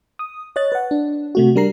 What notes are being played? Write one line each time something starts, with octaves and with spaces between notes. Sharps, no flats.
D#6
C#5 D#5 F#6 A6
B4 F#5
D4
C3 A3 F#4
G3 D4 A#4 A#5 C7